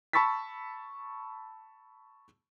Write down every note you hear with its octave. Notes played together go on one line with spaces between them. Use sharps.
A5 B5 C#6 E6 A6 B6